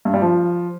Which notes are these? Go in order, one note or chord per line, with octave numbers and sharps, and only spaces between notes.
G2
G3
F3